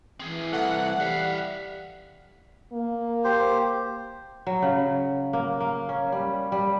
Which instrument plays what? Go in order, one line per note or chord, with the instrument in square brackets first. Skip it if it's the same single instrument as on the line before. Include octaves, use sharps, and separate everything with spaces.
[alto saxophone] E3 [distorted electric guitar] C4 G#4
[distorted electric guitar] C2 [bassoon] A3 [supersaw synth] F#5
[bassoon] G3 [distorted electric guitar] E5 F5
[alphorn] A#3
[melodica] G4 C5
[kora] F#3
C#3
A#3
A#3
C#4
G3
G3